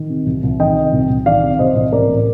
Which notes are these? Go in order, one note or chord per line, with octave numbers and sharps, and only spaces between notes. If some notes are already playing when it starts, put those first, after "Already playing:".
Already playing: D#3
C3
C2
C2
D#3 D#5 G5
C3
C2
C2
D#3 D5 F5
C3
C2 C5 D#5
C2
A1 A#4 D5
A2